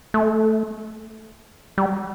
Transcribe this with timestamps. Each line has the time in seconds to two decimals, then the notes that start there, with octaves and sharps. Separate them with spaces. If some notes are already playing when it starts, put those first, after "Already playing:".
0.14 A3
1.78 G3